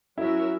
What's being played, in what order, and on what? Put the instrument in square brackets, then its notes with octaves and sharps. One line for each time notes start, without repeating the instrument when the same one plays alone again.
[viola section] F#3 C#4 F#4 A#4 E5 [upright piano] E4